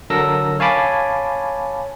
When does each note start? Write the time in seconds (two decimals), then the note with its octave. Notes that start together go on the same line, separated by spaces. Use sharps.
0.10 D3 F#3 A4 A#4 E6 A#6
0.60 C#5 F5 G#5 A5 B5 D6